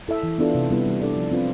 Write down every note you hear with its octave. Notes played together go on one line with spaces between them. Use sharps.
E4 A4 E5
E3
B3 D4 F4 A4
C3
G3 B3 E4 B4
G3
D4 A4 D5
F3
C4 F4 B4